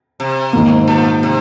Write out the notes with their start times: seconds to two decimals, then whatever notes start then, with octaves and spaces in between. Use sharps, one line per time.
0.20 C3
0.53 G#2 D#3 A#3
0.87 A#2
1.23 C3